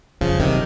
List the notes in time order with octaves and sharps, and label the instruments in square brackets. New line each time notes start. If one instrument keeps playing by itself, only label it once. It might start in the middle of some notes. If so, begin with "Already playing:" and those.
[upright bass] F2 [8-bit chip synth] C#3 F3
[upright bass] F#2 [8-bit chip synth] C3 D#3